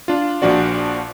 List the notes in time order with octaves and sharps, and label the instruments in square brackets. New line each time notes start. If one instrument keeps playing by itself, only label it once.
[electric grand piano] D4 F4
A#1 A#2 F3 D4 F#4 D5